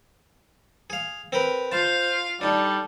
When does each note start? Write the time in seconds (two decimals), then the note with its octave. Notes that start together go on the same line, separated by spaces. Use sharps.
0.90 G#4 F5
1.32 C4 A#4 B4
1.72 F4 C5 F5 A5
2.41 G3 D4 D#4 A4